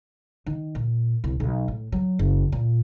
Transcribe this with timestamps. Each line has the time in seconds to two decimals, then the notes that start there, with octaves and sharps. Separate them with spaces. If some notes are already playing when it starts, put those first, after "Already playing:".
0.46 D#3
0.75 A#2
1.24 C2
1.40 B1
1.68 A2
1.92 F#3
2.19 F#1
2.52 A#2